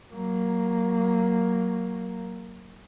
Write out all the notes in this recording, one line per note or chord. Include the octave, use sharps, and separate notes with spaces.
F#3 A#3